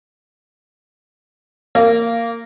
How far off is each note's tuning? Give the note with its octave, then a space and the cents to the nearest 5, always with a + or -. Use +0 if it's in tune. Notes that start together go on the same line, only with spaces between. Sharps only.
A#3 -15